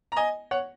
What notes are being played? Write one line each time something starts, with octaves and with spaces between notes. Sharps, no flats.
A#5
D#5 G#5
C#5 F#5